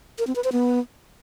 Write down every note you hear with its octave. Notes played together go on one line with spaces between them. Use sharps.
A#4
C4
B4
C5
B3